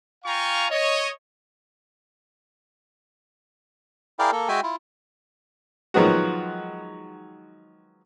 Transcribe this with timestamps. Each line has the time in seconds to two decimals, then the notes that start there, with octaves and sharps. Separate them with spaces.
0.25 F4 F5 G5 G#5 A#5 C#6
0.71 C#5 D#5
4.19 E4 G#4 A#4 D5 F5 G5
4.32 A#3 A4
4.48 G#3 F#4 E5 G5 G#5
4.63 E4 F4
5.94 D#3 F3 F#3 G#3 B3 F#4